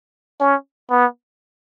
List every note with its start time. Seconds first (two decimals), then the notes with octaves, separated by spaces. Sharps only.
0.40 C#4
0.90 B3